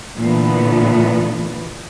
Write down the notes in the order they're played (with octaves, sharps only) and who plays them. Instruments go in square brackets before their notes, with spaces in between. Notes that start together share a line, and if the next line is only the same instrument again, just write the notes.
[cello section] A#2 D3 E3 A3 B3